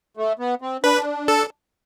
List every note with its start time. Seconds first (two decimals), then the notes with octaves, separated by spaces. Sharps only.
0.17 A3
0.39 B3
0.62 C4
0.83 D4 B4
1.28 A4